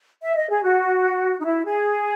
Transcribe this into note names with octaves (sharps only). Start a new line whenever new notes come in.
E5
D#5
G#4
F#4
D#4
E4
G#4